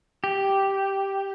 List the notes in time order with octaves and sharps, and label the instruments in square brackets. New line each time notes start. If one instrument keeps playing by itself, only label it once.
[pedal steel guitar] G4